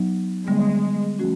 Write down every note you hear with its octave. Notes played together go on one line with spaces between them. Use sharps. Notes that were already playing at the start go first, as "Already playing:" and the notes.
Already playing: F#3 B3 D#4
D3 G3 G#3 B3
F3 A3 C#4 F#4